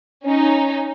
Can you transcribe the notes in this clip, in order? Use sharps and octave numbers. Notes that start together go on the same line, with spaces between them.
C#4 D#4